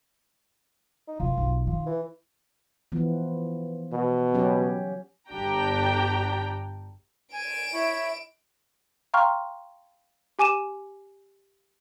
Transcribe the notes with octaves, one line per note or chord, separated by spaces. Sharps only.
D#4
C2 E4 F4
B1
D#3 F4
E3
E3 F3 B3
B2
F#3 C#4 G4
G1 D4 G4 G5 A#5
G#5 D7 E7
E4 C#5 E5 B5
F5 G5 A#5 C6 C#6 F6
G4 G#5 D6 D#7 E7